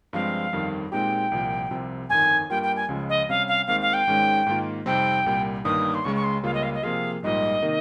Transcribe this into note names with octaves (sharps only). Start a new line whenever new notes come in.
G2 F3 G#3 C4 F5
G1 F2 D#3 G3
A#2 G#3 C4 D#4 G4 G5
C2 A#2 F3
C2 C3 F3 C4
G1 F2 D#3 G#5
G2 G3 A#3 F4 A#4 G5
G5
G#5
C#2 C#3 F3 G#3
D#5
C3 G3 C#4 F5
F5
D#2 D#3 G#3 C4 F5
F5
G5
G#1 G#2 D#3 G#3 C#4
G#2 D#3 A#3 F4
F2 C3 G3 C4 D#4 G5
C2 A#2 G3
G1 G2 D#3 G3 A#3 D#6
C6
C#2 C#3 G#3 C#6
C#6
C6
C#2 C#3 G3 A#3 F4 F5
D#5
F5
D#5
C3 F3 A#3 F4 G#4 F5
A#1 G#2 G3 A#3 F4 D#5
C3 D#3 A#3 D#4